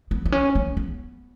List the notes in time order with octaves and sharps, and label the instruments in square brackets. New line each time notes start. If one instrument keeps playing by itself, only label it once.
[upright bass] B3
B3
C#4
A#3
B3